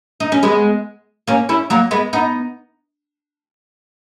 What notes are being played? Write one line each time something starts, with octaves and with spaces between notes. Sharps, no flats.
D#4
C#4
G#3 B3
A#3 C#4
C#4 E4
F#3 A#3
G#3 B3
B3 D#4